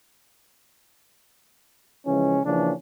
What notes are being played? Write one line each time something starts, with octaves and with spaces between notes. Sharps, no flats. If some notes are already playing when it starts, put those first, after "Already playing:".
C#3 E3 F3 G#3 C#4
C#3 E3 F3 A#3 C#4 D4